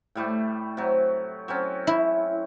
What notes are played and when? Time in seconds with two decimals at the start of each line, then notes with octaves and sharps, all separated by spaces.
0.15 A2 G3 A3
0.77 C3 F#3
1.48 F#3 C4 C#4
1.87 E4